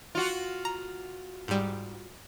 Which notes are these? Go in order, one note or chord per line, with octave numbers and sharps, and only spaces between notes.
F4 F#4
A#5
G#2 G3